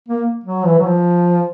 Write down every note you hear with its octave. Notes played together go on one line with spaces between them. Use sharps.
A#3
F#3
E3
F#3
F3